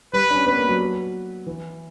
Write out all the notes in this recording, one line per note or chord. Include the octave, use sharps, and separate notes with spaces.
G3 B4
D4
C#4
B3 B4
A#3
F#3
E3